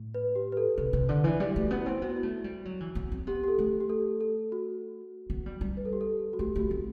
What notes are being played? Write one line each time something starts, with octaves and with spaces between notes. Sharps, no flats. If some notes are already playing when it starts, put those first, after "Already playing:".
Already playing: A2
B4
G4
B4
A4
C3 B4
C3
D3
E3
G3 G4
A3 F#4
B3
E4
C4
B3 F#4
E4
F#4
A3
G3
F#3
E3
B3
C4
B3 G4
G4
A4
A3
G4
A4
A4
F#4
B3
G3
G3
B4
A4
G4
A4
F#4
A3 G4
A3 F#4
C4